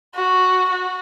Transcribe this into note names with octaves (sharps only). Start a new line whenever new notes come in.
F#4
F#4